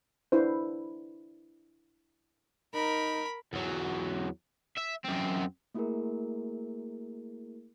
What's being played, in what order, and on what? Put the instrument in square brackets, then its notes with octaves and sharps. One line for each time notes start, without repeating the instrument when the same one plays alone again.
[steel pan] D4 E4 B4 C5
[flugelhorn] D#4 [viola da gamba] A#4 [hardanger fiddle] B5
[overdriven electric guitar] E2 F#3
E5
F#2 C4
[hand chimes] A3 A#3 E4 F#4 G#4 A#4